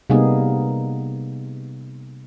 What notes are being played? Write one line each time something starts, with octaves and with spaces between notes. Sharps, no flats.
C3 G3 A#3 B3 D#4 G#4